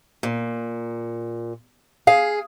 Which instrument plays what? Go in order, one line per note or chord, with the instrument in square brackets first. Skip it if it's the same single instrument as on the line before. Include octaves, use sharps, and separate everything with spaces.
[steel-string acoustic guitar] A#2
[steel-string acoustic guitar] G#4 [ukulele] F5